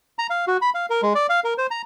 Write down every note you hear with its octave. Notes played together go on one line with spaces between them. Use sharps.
A#5
F5
F#4
B5
F5
A#4
G#3
D5
F5
A#4
C5
A#5